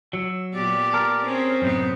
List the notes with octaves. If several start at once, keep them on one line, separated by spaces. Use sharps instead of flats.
F#3 E6
A#2 B3 G4 D5
A4 A#4
C4 C#4 G#4
F#2 A2 C3 B3 D#4